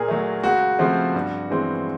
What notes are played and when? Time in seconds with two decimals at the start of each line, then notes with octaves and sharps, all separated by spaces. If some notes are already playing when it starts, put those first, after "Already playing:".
Already playing: A#2 G#4 A#4
0.08 F#3 A3
0.43 C#2 F#4
0.79 C#3 F3 A3 C4
1.14 G2
1.51 E3 G#3 C4